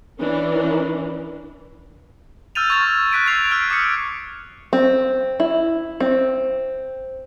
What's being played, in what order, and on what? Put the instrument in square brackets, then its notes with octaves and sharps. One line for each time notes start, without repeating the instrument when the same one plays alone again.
[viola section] E3 C#4 D4
[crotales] E6 F6 G6 A6 D#7 F7
C#6 G#6 A6 E7 F7
C#6 F#6 B6 D7 D#7
E6 G#6 C7 F7
E6 F6 G6 D7
D6 D#6 C#7
[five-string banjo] C4
E4
C4